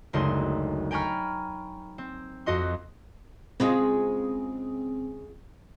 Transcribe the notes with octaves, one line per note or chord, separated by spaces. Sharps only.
F#1 D2 G#3 D#4 C6
G5 G#5 A#5 B5 C#6 F6
C4
F2 F#4 D#5 C6
C#3 G#3 C4 F4